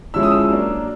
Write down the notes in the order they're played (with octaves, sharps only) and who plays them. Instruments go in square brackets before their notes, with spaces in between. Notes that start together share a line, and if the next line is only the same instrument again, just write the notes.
[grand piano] F3 G#3 C#4 E4 E6
D#6
E6
F#3 A#3 D4